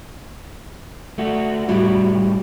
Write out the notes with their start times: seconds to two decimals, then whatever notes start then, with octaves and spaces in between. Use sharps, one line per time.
1.18 A3 F#4
1.69 A2 G3 E4 F#4